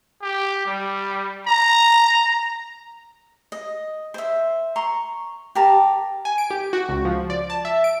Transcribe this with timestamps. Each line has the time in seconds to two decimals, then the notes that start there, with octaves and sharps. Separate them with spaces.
0.22 G4
0.66 G3
1.47 A#5
3.52 D#5
4.14 C5 E5
4.76 A#5 C6 C#6
5.55 G4 A#4 A5
6.25 G#5
6.38 D7
6.51 G4
6.73 F#4
6.89 C#2
7.05 F3
7.30 D5
7.50 A5
7.65 E5
7.84 D7